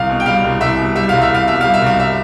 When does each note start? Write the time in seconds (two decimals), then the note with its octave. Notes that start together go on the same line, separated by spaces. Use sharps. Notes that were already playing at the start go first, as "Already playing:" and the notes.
Already playing: C2 F5
0.10 B2
0.20 G5
0.26 G3 F5
0.44 C2
0.61 C2 E5
0.78 B2
0.96 G3 E5
1.09 C2 F5
1.22 E5
1.31 C2 F5
1.48 B2 E5
1.61 G3 F5
1.74 E5
1.82 C2 F5
2.00 E5